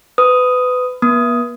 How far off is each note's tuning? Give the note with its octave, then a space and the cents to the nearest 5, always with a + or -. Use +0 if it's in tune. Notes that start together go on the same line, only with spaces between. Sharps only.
B4 +25 D#6 +0
B3 -40 D#6 +5